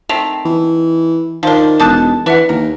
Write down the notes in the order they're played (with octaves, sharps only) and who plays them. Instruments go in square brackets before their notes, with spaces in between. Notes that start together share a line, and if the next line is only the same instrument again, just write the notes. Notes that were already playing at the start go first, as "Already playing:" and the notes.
[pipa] D#3 A3 C4 [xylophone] F7
[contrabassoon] E3
[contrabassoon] D#3 [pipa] F3 D4 [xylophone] A#4 C5 F5
[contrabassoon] E1 [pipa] D#4 A4 A5 [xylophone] D6 F#6
[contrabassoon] E3 [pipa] D4 [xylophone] B4 E5 F#5
[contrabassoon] D#2 [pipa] A#4